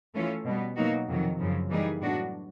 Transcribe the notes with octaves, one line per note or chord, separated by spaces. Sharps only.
E3 A3 C#4 F4 A4
B2 G3 B3
B2 F#3 A#3 D#4 F#4
F2 C3 D#3 F#3
F#2 C#3 F3
E3 G3 A#3 D#4 G#4
A2 F#3 B3 D4 F#4